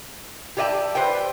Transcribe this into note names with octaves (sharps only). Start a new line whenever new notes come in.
G4 G#4 D5 D#5 G5 A5
B4 C5 D5 G5